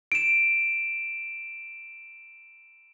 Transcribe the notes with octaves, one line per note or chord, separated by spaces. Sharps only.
D7 E7